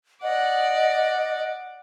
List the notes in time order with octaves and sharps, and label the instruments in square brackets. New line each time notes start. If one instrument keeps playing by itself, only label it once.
[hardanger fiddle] D5 F#5 [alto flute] D#5